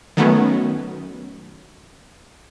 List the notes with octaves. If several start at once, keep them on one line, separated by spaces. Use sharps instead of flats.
D#3 F#3 A3 B3 C#4